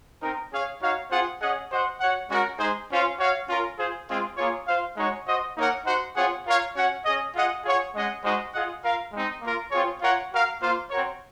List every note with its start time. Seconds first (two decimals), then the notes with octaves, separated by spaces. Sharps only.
0.22 C4 D#4 A#4
0.52 C#4 G#4 C#5 F5
0.82 D#4 F#4 C#5 F5
1.11 C4 F4 G#4 C5 F#5
1.40 C#4 G#4 D#5 F#5
1.70 F#4 C5 D#5 F#5
2.00 F#4 C#5 F#5
2.30 G#3 C#4 F#4 A#4
2.59 G#3 D#4 G#4 C5
2.90 C#4 F4 C5 F5
3.19 F#4 C#5 F5
3.49 C#4 F4 A#4
3.78 F4 G#4 C5
4.08 G#3 C4 F4 G#4
4.37 A#3 F4 G#4 C#5
4.67 F4 C5 F5
4.96 G#3 D#4 F#4 C#5
5.27 F#4 C5 D#5
5.57 A#3 D#4 A#4 C#5 F#5
5.85 D#4 F#4 C5 F#5
6.15 C4 F4 G#4 C#5 F#5
6.46 F4 A#4 C#5 F5
6.75 C#4 F#4 C#5 F#5
7.05 C#4 G#4 D#5
7.34 F4 G#4 D#5 F#5
7.64 F4 G#4 C#5 F#5
7.94 G#3 C#4 G#4 D#5 F#5
8.23 G#3 D#4 F#4 C5 D#5
8.54 F4 G#4 D#5 F#5
8.83 F4 A#4 F5
9.12 G#3 C4 D#4
9.41 A#3 F4 A#4
9.71 C4 F4 G#4 C#5
10.01 F4 A#4 C#5 F#5
10.31 F#4 A#4 F5
10.61 A#3 F4 C5 F5
10.90 C4 F#4 A#4 C#5